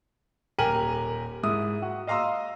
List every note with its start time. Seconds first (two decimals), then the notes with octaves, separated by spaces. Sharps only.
0.58 D#1 G4 A#4 G#5 D#7 F#7
1.43 G#2 E4 D#6
1.82 F#4
2.07 D#5 F5 A#5 C6 D#6 E6